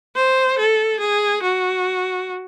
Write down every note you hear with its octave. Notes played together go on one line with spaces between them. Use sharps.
C5
A4
G#4
F#4